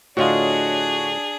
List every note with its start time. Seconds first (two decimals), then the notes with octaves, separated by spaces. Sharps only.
0.17 A2 D3 D4 F4 F#4 G#4 C#5 D#5